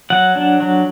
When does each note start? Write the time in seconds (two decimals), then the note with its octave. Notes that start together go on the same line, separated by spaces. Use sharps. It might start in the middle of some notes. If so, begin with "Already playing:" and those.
0.10 F#3 F#5
0.36 D4
0.60 F#3